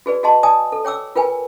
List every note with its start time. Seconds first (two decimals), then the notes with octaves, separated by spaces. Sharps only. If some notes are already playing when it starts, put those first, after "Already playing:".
0.06 F#4 G#4 B4 D5
0.23 F#4 G#4 D#5 A5 C6
0.43 D5 G#5 A5 D#6
0.72 A4
0.85 C#5 G5 D6 E6
1.16 F4 A#4 B4 G5 G#5